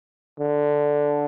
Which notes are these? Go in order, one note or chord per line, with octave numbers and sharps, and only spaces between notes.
D3